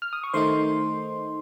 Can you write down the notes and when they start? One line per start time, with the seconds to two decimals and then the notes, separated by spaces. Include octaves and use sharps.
0.02 F6
0.13 D#6
0.24 C#6
0.34 D#3 A3 D#4 C5 C6